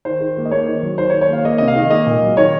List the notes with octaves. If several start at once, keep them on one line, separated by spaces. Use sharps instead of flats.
D#3 C5
D#3
A#3
D#5
A#3 C#5
D#3
F#3
D#3 C5
C#5
D#3
C#5
A#3 F5
A#3 D#5
C3 D#5
F5
D#3
A#3 D#5
A#2
F#3
D#3 C#5